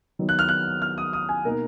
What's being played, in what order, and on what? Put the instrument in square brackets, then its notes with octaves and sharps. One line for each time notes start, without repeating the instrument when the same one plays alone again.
[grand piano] D#3 F#3 B3
F#6
F6
F#6
F6
D#6
D#6
G#5
B2 A#3 D#4 A#4